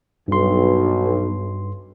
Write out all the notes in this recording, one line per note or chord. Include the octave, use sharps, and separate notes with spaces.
B1 G2 C6